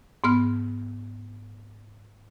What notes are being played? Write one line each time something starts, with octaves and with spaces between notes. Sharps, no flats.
G#2 B3 F6